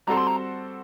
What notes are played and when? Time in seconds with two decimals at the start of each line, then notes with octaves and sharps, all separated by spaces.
0.07 G3 C4 F#4 A4 C5 A#5
0.17 C6
0.27 A#5